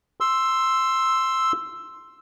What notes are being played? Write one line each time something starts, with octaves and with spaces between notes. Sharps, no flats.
C6 E6